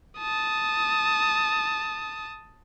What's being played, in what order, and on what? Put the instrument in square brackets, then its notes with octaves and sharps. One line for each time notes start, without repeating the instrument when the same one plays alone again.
[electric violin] A5 D#6